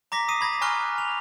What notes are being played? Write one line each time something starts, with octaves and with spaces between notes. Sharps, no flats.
A#5 D6 A#6 B6
D#6 C7 D#7
B5 G#6 A#6
G#5 A#5 C#6 F6 F#6 G7
F7